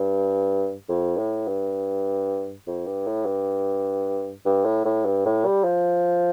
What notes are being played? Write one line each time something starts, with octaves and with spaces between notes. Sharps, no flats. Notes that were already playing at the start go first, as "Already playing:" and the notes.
Already playing: G2
F2
A2
G2
F2
G2
A2
G2
G2
A2
A2
G2
A2
G3
F3